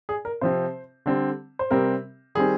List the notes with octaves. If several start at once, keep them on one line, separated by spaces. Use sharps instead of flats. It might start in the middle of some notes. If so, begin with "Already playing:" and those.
G#4
A#4
C3 F3 C4 C5
D3 G3 C4
C5
C3 G3 C4 A#4
D#3 G3 C4 G#4